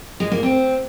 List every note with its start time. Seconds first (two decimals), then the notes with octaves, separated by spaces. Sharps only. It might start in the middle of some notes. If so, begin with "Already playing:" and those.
0.20 G#3
0.32 A#3
0.43 C4